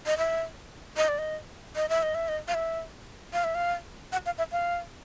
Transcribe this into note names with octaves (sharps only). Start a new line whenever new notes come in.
D#5
E5
D#5
D5
D#5
D#5
E5
D#5
E5
D#5
F5
E5
F5
E5
F5
F#5
F5
E5
F5